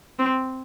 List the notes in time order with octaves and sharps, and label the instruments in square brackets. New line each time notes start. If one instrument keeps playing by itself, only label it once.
[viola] C4